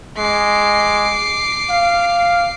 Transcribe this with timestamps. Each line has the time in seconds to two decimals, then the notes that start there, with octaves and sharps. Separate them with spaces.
0.17 G#3 D6 C7
1.70 F5